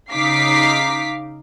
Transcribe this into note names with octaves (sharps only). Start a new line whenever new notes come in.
C#3 D#4 F5 D6 B6 C7